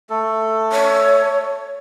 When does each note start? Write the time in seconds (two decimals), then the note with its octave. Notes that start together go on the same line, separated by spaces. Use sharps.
0.10 A3 A4
0.72 C#5